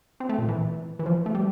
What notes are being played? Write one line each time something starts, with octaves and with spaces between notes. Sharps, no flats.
C4
A3
A#2
E3
E3
F3
A3
G3